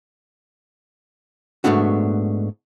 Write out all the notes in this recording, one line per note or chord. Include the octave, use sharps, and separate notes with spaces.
G#2 B2 A3 B3 D4 F#4